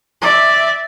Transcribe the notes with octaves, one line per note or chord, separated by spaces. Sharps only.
D5 E5